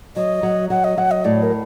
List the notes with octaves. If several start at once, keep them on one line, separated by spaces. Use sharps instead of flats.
F#3 D#5
F#3
F#3 F#5
D#5
F#3 F#5
D#5
A2 D5
A#4